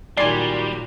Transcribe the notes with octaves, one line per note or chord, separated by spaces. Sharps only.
A#2 D#3 F#3 G3 D5 G#5 C6 C7